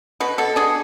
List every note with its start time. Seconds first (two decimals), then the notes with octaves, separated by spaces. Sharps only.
0.20 B2 B4
0.38 B2 A4
0.56 D4 G#4